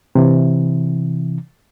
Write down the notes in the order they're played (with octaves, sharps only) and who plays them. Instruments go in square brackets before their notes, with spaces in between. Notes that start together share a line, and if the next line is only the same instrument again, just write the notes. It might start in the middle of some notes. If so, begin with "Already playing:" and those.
[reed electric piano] C3 E3